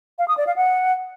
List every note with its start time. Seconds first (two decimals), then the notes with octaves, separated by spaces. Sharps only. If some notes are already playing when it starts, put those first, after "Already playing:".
0.19 F5
0.28 D#6
0.37 D5
0.47 F5
0.56 F#5